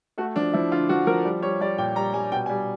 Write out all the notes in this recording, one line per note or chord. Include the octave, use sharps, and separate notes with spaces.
A3 F#4
F3 D4
F3 E4
D3 F4
F3 F#4
F3 A#4
G3
G3 C#5
G3 D5
A#2 G5
G3 A#5
G3 G#5
B2 G5
G#5
G3